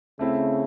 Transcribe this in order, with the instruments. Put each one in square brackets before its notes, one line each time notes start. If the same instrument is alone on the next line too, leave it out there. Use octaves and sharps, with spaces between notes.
[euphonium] C#3 [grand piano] A3 C4 E4